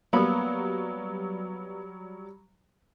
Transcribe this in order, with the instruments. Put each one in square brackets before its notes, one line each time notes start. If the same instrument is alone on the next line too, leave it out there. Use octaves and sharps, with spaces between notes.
[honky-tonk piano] F#3 G3 [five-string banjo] A#3 B3 B5